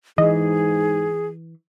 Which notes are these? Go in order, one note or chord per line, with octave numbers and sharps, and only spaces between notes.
G#2 E3 G#4 D#5